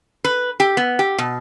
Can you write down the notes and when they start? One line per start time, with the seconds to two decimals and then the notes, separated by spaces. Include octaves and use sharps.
0.24 B4
0.60 G4
0.77 B3
0.99 G4
1.18 B2